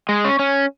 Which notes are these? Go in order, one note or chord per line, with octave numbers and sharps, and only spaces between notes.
G#3
C#4
C#4